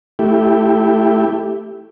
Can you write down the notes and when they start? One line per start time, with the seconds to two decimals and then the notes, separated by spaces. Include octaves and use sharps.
0.19 A3 E4 G4